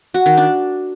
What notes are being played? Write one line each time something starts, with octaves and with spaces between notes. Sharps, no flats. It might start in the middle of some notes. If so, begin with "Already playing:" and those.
F#4
D#3
D4